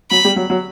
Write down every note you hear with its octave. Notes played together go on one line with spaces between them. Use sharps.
F#3 B5
G3
F#3
F#3